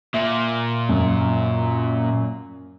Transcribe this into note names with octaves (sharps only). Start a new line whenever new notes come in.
A#2 E5
F#2